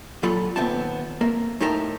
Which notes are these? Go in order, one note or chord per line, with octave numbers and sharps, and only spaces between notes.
A#2 F#3 F4 A4 B5
D#2 A#2 B3 C4 E5 A5
A#3 A#4 E5
A2 D#4 G4 A#4 E5 A5